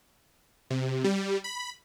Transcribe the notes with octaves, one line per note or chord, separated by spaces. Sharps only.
C3
G3
B5